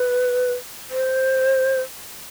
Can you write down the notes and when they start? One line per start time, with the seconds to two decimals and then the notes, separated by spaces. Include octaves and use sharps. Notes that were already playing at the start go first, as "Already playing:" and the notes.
Already playing: B4
0.91 C5